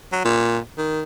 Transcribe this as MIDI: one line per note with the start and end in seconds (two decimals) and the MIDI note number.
0.12 0.24 54
0.25 0.58 46
0.78 1.03 51